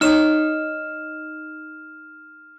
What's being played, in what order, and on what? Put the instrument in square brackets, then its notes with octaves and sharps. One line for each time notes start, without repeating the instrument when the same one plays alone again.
[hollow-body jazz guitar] D#4 C#5 [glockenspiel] F6 E7